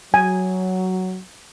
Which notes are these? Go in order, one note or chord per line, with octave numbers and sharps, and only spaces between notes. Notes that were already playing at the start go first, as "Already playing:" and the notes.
F#3 G#5